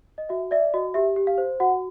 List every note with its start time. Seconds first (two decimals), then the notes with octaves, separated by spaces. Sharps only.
0.18 D#5
0.29 F#4 E5
0.51 D5 E5
0.74 F#4 D#5
0.94 G4 E5
1.16 G4
1.27 F5
1.38 C5
1.60 F#4 F#5